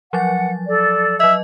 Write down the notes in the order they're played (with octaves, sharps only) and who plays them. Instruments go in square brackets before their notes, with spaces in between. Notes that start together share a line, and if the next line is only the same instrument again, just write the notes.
[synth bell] F3 F#3 A6 [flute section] F#5
[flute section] A4 D5
[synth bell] F#3 D#5 [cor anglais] E5